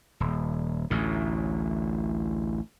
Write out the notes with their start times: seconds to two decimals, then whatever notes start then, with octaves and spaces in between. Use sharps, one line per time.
0.20 D#1
0.90 A1 D2 A2